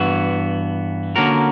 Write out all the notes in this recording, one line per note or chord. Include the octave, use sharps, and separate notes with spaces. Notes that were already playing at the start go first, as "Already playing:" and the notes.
Already playing: G2 E3 B3 F#4
D3 A#3 C#4 F#4 A#4